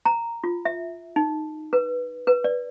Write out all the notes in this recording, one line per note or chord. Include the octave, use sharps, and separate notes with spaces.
A#5
F4
E5
D#4
B4
B4
D5